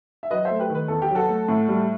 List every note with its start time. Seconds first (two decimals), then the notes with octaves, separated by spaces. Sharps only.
0.23 E5
0.31 F#3 B4 D#5
0.45 A3 C5 E5
0.60 G4 B4
0.70 D#3 B4
0.88 E2 A4
1.02 G4
1.10 F#3
1.15 F#4 A4
1.29 A3
1.48 A2
1.68 G3